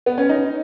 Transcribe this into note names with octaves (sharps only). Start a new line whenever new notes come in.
B3
C#4
D#4